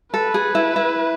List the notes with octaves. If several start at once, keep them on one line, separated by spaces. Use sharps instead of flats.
A4 B4
G#4
E4
E4